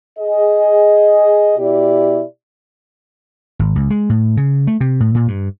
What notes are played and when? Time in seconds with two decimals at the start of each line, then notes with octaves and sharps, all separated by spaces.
0.19 G#4 D#5
1.58 B2 E4 G4 D5
3.59 G#1
3.76 C#2
3.90 G#3
4.10 A2
4.37 C#3
4.67 A3
4.81 C3
5.00 A2
5.15 A#2
5.28 G2